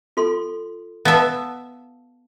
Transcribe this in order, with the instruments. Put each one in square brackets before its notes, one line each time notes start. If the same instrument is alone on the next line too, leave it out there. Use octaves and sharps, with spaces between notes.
[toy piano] F4 A4 C6
[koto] B3 E5 [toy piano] F5 A5